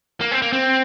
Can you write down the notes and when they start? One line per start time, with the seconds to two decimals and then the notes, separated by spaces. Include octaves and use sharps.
0.21 A#3
0.31 C4
0.42 A#3
0.53 C4